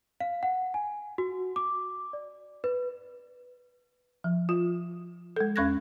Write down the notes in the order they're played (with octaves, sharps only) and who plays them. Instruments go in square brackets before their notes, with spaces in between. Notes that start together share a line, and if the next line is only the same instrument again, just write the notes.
[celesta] F5
F#5
G#5
F#4
D6
D5
B4
[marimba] F3
F4
G#3 A4
E2 C#4 C#6 F#6 G#6 A#6